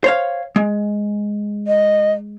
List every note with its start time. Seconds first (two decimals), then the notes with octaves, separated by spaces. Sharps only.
0.04 C5 C#5 F5
0.56 G#3
1.67 D#5